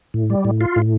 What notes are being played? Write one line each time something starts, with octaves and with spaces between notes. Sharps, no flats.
A2
G3
A2
F4
A2